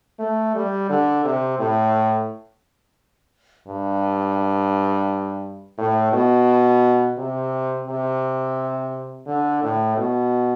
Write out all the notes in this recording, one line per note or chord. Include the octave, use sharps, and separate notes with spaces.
A3
G3
D3
C3
A2
G2
A2
B2
C3
C3
D3
A2
B2